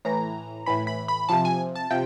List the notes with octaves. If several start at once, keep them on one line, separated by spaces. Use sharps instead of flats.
A2 E3 A#5
A2 E3 B5
B5
B5
C3 F3 A5
G#5
A5
C3 F3 G5